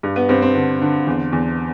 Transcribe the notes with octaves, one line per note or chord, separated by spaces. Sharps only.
G2
B3
G2 C4
C4
D3
D3
E2
E2